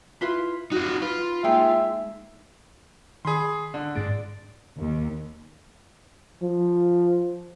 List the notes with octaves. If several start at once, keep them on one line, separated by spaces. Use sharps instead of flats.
E4 F4 B4
D#4 F4 F#4
F4 B4
G#3 A#3 D#4 G#4 E5 G5
D#3 G#4 B5 C6
D3
G#2 G#3 D4 A6 D7
D#2
F3